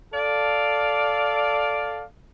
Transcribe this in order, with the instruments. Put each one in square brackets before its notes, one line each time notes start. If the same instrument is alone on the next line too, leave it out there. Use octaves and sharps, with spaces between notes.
[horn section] A4 D5 F5